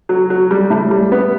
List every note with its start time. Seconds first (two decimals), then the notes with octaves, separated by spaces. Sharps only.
0.09 F#3
0.30 F#3
0.51 G3
0.70 A2
0.91 G3
1.12 B3